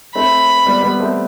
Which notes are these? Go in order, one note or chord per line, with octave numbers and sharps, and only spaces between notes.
A3 C4 B5
G3 B3
G3 B3
A3 C4